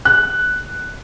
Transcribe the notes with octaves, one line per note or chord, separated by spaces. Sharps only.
F#6